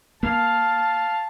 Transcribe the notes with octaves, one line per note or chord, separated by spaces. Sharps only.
A#3 F5 A5